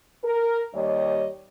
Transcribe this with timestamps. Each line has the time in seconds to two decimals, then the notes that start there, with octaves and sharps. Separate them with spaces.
0.24 A#4
0.74 D#2 G3 C#5 D#5